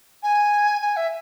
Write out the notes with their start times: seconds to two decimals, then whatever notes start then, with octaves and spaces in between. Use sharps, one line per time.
0.23 G#5
0.81 G#5
0.96 E5